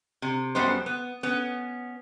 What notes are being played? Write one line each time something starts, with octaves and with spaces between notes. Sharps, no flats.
C3
F#2 G3 B3 C5
B3
B3 C#4